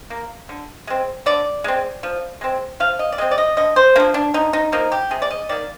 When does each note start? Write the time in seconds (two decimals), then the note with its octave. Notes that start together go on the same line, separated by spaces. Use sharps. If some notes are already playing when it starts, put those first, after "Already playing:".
0.10 A#3
0.49 D3
0.87 G#3 C4
1.26 D3 D5
1.64 G#3 C4
2.03 F3
2.41 G#3 C4
2.80 F3 F5
2.99 D#5
3.12 D5
3.18 G#3 C4 D#5
3.31 D5
3.38 D#5
3.57 D3 D#5
3.76 C5
3.96 F3 A#3 D4
4.14 D4
4.34 D3 D#4
4.53 D#4
4.72 F3 A#3 D#4
4.92 G4
5.11 C3 G#4
5.22 D5
5.30 D#5
5.49 D#3 A#3 D5